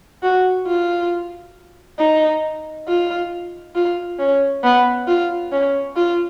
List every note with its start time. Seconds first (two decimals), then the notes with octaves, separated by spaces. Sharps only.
0.23 F#4
0.67 F4
1.99 D#4
2.88 F4
3.75 F4
4.19 C#4
4.63 B3
5.08 F4
5.52 C#4
5.96 F4